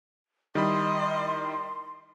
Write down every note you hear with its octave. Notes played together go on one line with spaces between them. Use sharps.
D#3 G3 E4 D#5 B5 C6